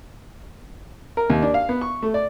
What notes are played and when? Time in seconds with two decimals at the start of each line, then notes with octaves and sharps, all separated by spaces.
1.17 A#4
1.30 D#2
1.42 D4
1.54 F5
1.69 B3
1.81 C#6
2.03 A3
2.14 D5